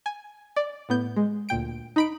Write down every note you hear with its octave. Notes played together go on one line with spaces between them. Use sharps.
G#5
D5
A2 B3 G6
G#3
D2 A#2 G5 D7
D#4 B5 D7